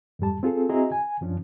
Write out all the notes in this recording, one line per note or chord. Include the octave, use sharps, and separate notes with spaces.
F2 G#2 G3 A5
C4 F4 G#4 A4
C4 E4 F#4 G#4 D#5 A#5
G#5
F#2 F3 C#4 D4